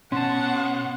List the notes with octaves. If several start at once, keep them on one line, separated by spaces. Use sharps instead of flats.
B2 C#4 F#5 A5 C6